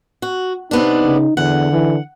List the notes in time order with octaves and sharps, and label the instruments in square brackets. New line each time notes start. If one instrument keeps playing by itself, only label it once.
[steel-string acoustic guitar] F#4
[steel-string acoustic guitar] C3 B3 D4 [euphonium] D#4
[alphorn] C#3
[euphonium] E2 [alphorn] D3 [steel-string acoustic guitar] F#5
[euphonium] E3